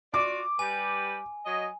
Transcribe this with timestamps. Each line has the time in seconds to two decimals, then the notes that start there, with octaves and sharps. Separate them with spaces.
0.14 F4 F#4 D5 D6
0.59 G3 G4 B4 G#5
1.46 F#3 D#5